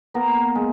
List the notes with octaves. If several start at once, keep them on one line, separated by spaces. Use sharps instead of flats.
A#3 B3 A#4
G#3